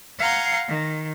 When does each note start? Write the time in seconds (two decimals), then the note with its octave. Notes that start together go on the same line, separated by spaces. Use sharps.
0.18 F5 F#5 G#5 A#5 C6
0.67 D#3